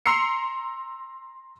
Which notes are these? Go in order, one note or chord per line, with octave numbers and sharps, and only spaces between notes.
A#5 C6 E6 C7 C#7